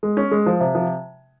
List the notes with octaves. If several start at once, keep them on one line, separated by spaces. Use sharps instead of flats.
G#3
C#4
G#3
F3
C3
F3